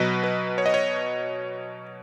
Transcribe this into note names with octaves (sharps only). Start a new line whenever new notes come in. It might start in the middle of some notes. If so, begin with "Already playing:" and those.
Already playing: B2 F#3 B4 D#5
B4
C#5
D#5
C#5